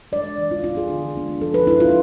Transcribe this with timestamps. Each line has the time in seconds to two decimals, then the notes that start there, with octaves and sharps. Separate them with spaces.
0.12 G#3 D4 D5
0.38 E3
0.51 F4
0.64 B3 D4 F4
0.77 G#4
0.90 D3
1.16 G#3 B3 D4
1.41 F3 A4
1.54 B4
1.67 B3 D4 E4
1.80 F4